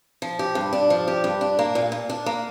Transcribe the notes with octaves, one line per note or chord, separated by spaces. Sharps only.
F3
G4
G2
D4
F3
G4
G2
D4
A#3
A#2
A#2
D4
A#3